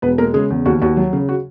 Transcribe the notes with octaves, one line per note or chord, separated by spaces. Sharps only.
E1 B3 B4
G#3 A#3 A#4
C#3 G#3 G#4
E2
D#2 F#4
D#2 F#4
F#3
C#3
F#4